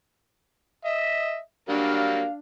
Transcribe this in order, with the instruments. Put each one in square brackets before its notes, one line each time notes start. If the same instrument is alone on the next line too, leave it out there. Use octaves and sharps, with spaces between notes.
[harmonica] D#5 E5
[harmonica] F#3 G3 A#3 [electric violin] D4 [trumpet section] F5